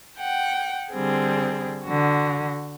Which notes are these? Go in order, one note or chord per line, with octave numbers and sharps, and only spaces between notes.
F#5 G5
D3 G3 C4 G#4
D3 F#4